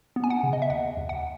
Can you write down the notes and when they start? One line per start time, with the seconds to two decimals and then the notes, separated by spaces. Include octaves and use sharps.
0.16 B3
0.24 G#5
0.30 F#5
0.43 C#3
0.53 D#5
0.62 E5
0.69 D#2 F#5
0.97 D#2
1.09 F#5